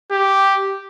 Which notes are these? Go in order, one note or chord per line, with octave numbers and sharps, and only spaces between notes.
G4